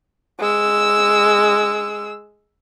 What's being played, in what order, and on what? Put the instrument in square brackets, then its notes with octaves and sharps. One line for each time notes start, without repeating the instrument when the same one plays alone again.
[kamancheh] G#3 E6